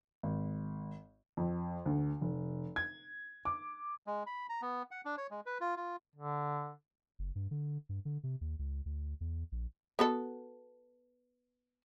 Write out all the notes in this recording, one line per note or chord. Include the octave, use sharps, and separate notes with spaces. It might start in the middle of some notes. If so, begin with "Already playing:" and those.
G#1
F2
D2
F1
G#6
D6
G#3
B5
A#5
B3
F#5
D4
C#5
G#3
B4
F4
F4
D3
F#1
G2
D3
G2
D3
C3
D#2
C#2
D2
E2
A#1
B3 F#4 A4